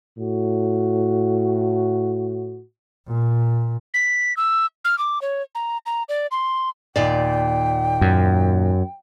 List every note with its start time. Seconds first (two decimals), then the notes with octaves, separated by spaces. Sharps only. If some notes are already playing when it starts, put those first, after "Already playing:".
0.19 A2 F#4
3.07 A#2
3.94 B6
4.37 E6
4.85 F6
4.98 D6
5.22 C#5
5.55 A#5
5.86 A#5
6.09 D5
6.31 C6
6.96 D#2 A#2 D5 G5
8.01 F#2